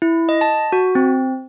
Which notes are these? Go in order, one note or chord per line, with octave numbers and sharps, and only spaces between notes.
E4
D#5
A5
F#4
C4